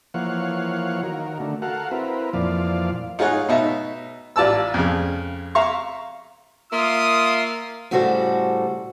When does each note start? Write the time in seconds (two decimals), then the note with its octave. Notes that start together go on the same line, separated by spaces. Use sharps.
0.14 E3 F3 A#3 C#5 F5 F#5
1.03 D#3 F#4 A#4
1.40 D3 A3
1.62 F#4 A4 A#4 F5 F#5
1.91 C4 E4 A#4 B4
2.33 F2 A#2 E3 F3 D5 F5
3.19 D#4 F4 G#4 C#5 F#5
3.49 B2 D#4 E5
4.36 A1 F4 D5 A5 E6
4.74 F2 C#3
5.55 E5 F5 A#5 C#6
6.73 A#3 F4 E5 C6 D#6
7.91 A2 C#3 G3 F#4 A4 C5